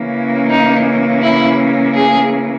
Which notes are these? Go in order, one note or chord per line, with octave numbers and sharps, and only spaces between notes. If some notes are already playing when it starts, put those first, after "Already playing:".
Already playing: C#3 E3 A#3 C#4
D#4
E4
G#4